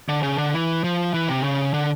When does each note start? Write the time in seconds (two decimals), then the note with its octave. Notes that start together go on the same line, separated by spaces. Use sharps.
0.09 D3
0.23 C#3
0.38 D3
0.53 E3
0.84 F3
1.14 E3
1.29 C3
1.44 C#3
1.74 D3